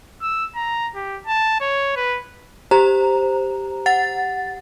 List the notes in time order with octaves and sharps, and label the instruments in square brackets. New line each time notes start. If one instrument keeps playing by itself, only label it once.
[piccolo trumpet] E6
A#5
G4
A5
C#5
B4
[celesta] G4 [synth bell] C5 A#5
[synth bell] F#5 A6